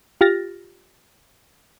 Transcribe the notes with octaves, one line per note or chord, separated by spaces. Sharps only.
F4 G4 F6 A6 A#6